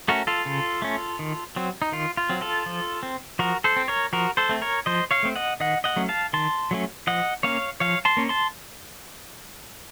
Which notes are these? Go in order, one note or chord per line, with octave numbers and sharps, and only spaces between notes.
A3 C#4 F#4 A#4
F4 A4
C#3
A3 C#4
D#3
F#3 C4
D#4
D#3 F4
F4
F#3 C4
F4 A4
F3
C4
F3 F#4 A#4
A4 C5
C4
A#4 C#5
F3 F#4 A#4
A4 C5
A3 C4
A#4 C#5
F3 C5 D#5
C#5 F5
A3 C4
D#5 F#5
D#3 D#5 F#5
D#5 F#5
F#3 A3 C#4
F5 A5
D#3 A5 C6
F#3 A3 C#4
F3 D#5 F#5
A#3 C#4 C#5 F5
F3 C#5 F5
A5 C6
A#3 C#4
A5 C6